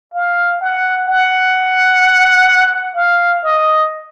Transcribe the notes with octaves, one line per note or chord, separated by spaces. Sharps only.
F5
F#5
F#5
F5
D#5